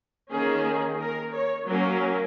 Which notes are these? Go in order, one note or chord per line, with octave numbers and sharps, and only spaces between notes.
D#3 A#3 C#4 G#4
A#4
C#5
F#3 A#3 C#4 A#4